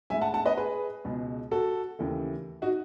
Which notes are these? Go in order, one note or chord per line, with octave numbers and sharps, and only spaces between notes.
A2 G#3 E5 G#5
F#5 A5
F#5 A5
B4 D#5
G#4 B4
C#2 B2 G#3
F#4 A4
D#2 C#3 E3 A3
D#4 F#4